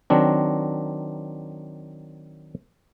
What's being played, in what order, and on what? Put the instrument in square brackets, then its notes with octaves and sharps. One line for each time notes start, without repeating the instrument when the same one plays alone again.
[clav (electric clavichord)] D#3 F#3 C4 D4